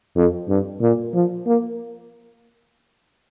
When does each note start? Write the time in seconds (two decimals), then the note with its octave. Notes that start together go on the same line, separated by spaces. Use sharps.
0.16 F2
0.49 G2
0.81 A#2
1.14 F3
1.46 A#3